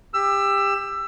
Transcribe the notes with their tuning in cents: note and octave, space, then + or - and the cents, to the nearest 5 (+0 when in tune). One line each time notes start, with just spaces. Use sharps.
G4 +25 E6 +20